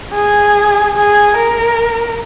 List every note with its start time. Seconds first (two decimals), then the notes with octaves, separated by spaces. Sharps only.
0.15 G#4
0.97 G#4
1.37 A#4